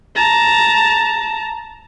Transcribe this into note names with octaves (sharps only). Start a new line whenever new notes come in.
A5 A#5